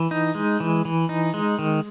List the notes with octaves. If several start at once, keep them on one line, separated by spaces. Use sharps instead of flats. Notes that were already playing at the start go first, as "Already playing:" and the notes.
Already playing: E3
D#4
G#3
E3
E3
D#4
G#3
D#3